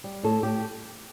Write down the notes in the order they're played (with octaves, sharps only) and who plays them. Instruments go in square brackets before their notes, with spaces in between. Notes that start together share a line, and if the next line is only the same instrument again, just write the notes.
[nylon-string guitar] G3
A2 A4
A2 G4